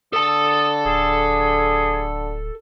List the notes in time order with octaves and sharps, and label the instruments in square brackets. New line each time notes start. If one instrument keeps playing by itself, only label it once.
[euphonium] D3 [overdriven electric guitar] A4 A5 [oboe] D#6
[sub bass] D1 [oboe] G#4